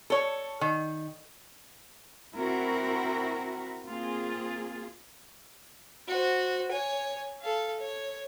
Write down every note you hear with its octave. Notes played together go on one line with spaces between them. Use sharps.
A4 C#5
D#3
C4 E4 F#4 A#4
A#3 C4 F4 G#4
F#4 C5
C#5 G#5
A4 F5
C#5